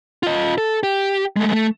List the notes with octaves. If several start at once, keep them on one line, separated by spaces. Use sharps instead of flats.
F4 D#5
A4
G4
G#3 A3
A3